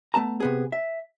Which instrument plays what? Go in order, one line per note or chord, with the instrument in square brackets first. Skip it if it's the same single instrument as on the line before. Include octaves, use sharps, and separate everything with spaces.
[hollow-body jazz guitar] A3 B3 A5 A#5
C3 B3 G#4
E5